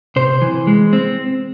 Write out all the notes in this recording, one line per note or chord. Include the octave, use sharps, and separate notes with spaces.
C3 C5
E3
G#3
C4